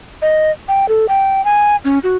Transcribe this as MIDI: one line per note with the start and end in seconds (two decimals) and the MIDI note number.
0.22 0.51 75
0.68 0.88 79
0.89 1.06 69
1.09 1.44 79
1.45 1.76 80
1.85 1.99 61
2.04 2.17 66